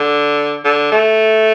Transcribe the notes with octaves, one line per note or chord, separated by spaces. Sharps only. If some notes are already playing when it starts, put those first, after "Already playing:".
Already playing: D3
D3
A3